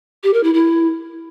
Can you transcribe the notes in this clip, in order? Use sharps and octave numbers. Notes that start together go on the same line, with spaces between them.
G4
A#4
E4
E4